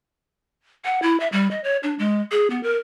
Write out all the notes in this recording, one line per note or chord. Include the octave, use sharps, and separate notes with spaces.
F#5
E4
E5
G3
D#5
C#5
D4
G#3
G#4
B3
A#4